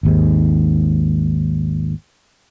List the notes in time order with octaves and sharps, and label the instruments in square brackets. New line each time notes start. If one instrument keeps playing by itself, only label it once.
[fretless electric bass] G#1 D#2 G#2